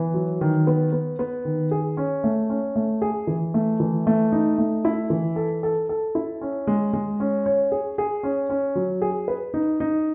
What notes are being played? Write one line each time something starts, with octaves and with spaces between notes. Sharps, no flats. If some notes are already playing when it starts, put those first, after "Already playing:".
Already playing: E3 B3
F#3
D#3
B3
B3
B3
D#3
G#4
C#4
A3
C#4
A3
G#4
E3
A3
E3
A3
D#4
A3
E4
E3
A4
A4
A4
E4
C#4
G#3
G#3
C#4
C#5
G#4
G#4
C#4
C#4
F#3
G#4
B4
D#4
D#4